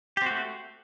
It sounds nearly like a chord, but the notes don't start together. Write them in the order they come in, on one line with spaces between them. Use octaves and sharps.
G4 C4 F#4 A3